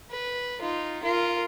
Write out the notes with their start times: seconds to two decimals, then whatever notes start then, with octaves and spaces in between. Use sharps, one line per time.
0.11 B4
0.61 D#4 F4
1.03 F4 A#4